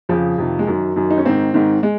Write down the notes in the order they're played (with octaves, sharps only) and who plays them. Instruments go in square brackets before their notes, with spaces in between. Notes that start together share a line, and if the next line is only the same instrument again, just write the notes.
[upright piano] F2 C#3 F3
F2 C3 D#3
G#3
F#2 D#3 F#3
F#2 D#3
D#4
C#4
G#2 D#3 C4
G#2 D#3
G#3